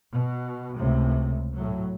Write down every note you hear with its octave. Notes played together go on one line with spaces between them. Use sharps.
B2
C#2 A2 C3
A2 F#3